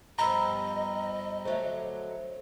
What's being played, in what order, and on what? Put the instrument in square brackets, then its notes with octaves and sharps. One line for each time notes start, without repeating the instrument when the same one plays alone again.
[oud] G2 F3 B3 [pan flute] D#5 [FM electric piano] A#5 [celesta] B5 E6
[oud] D3 F#3 A3 [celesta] C5 E5